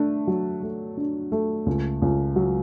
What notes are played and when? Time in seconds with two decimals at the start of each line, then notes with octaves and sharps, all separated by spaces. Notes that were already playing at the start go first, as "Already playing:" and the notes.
Already playing: A3 D4
0.27 F#3
0.63 A3
0.97 D4
1.32 A3
1.66 C#2
2.02 C#2
2.36 F#3